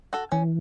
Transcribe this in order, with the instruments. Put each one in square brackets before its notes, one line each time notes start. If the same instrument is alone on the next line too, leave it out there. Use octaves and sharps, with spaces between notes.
[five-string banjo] F#4 A4
[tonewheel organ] E3 [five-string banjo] C#4